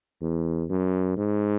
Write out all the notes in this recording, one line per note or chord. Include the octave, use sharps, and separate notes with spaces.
E2
F#2
G#2